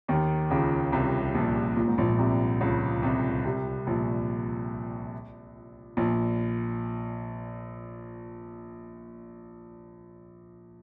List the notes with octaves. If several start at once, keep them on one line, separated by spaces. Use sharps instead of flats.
D#2 D#3
C#2 C#3
C2 C3
A#1 A#2
A#2
G#2
A#1 A#2
C2 C3
C#2 C#3
C2 C3
C2 C3
A#1 A#2
A#1 A#2